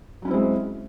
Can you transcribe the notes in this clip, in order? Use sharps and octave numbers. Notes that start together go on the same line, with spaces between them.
F#3 G#3 C4 C#4 E4